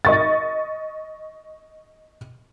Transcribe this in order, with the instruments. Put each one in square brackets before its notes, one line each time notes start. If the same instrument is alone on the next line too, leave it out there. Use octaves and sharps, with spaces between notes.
[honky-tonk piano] D#5 C#6 A6